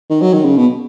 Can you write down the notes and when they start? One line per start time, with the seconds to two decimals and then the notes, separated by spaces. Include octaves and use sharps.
0.10 D#3
0.22 F#3
0.33 D#3
0.45 C#3
0.57 B2